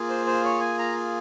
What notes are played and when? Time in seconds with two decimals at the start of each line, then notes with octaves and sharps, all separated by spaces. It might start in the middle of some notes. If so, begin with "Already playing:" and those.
Already playing: A#3 F4 G#4
0.09 C5
0.26 C5
0.44 C#5
0.61 G#5
0.79 A#5